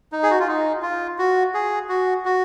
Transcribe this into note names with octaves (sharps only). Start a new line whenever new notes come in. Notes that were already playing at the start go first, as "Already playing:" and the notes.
D#4
G#4
F#4
F4
D#4
F4
F#4
G#4
F#4
F#4